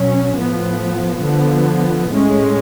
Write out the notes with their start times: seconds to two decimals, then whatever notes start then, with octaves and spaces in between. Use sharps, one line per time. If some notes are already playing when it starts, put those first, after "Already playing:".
Already playing: B2 F#3 C#4
0.35 A2 F3 B3
1.22 D3 F3 B3
2.10 A2 G#3 C#4